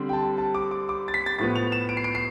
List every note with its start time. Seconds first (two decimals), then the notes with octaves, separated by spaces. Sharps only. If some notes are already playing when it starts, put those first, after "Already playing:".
Already playing: D3 G3 C4
0.09 G5
0.13 A5
0.38 A5
0.54 D6
0.71 D6
0.89 D6
1.08 A6
1.14 B6
1.26 A6
1.38 A2 F3 B3 A6
1.56 F7
1.72 E7
1.89 D7
1.97 C7
2.04 D7
2.15 C7